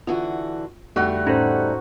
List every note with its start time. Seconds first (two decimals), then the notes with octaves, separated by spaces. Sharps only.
0.07 D3 E3 F4 F#4
0.96 F2 D3 G3 A3 F#4
1.26 A2 C#4 D#4 A4 C5 A#6